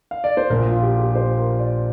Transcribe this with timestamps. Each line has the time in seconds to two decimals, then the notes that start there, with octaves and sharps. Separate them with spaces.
0.11 F5
0.24 D5
0.37 C5
0.50 A#1 A#2 F3 A#4
0.67 F4
0.82 G4
0.99 G4
1.15 C5
1.37 A#4
1.59 D5